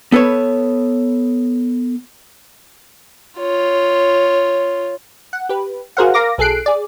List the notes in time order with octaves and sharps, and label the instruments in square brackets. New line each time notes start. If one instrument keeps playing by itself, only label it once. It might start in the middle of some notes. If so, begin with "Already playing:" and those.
[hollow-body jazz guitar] B3 A4 B4 C#5
[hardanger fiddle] F4 C#5
[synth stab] F#5
G4 B4
F#4 G#4 A#4 C5 F5 F#5
A#4 F5 D6 A#6
B1 G#4 A4 F#6 C7 D7
G#4 D5